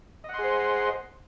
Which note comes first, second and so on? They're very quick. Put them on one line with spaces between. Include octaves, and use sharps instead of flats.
D#5 F#5 C6 G#4 C5